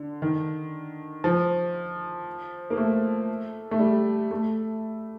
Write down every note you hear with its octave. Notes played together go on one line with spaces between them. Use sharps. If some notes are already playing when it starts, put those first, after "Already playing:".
Already playing: D3
D#3
F3
A#3
A3
A3
G3
A3